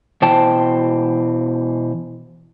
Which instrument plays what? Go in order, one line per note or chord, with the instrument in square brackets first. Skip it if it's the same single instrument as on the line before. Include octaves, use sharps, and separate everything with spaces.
[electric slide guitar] B2 E3 C5 G5 A5